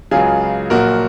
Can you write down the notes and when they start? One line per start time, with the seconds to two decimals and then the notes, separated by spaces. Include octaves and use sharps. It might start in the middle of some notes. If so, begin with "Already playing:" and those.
0.11 C#2 C#3 F#3 F4 G#4
0.70 A#1 A#2 F#3 F#4 A#4